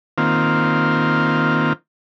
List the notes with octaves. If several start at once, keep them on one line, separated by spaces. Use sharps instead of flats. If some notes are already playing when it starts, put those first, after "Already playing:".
D#3 A#3 C4 F4